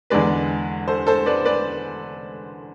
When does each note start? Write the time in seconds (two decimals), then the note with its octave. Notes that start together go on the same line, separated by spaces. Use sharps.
0.10 E2 D3 G#3 B4 D5
0.88 A4 C5
1.07 A4 C5
1.26 B4 D5
1.45 B4 D5